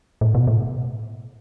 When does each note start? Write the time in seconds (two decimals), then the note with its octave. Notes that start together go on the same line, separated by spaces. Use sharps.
0.21 A2
0.35 B2
0.47 A2